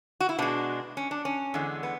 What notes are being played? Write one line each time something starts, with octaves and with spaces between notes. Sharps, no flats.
F#4
E4
B2 G#3 D4
C#4
D4
C#4
E2 D3 G#3
B3